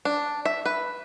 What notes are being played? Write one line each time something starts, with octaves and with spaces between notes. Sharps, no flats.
D4
E5
B4